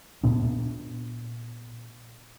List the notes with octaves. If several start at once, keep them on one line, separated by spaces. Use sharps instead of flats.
A#2 B3 D4